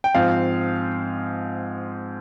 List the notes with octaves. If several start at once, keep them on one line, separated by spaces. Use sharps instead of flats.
G5
G#2 F3 C4 F5